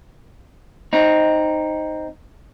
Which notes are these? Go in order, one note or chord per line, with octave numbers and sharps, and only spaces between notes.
C4 D#4